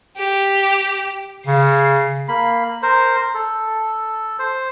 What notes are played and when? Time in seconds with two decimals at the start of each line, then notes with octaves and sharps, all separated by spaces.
0.17 G4
1.47 C#3 C7
2.28 A#3 B5
2.82 A#4 C5
3.34 A4
4.39 C5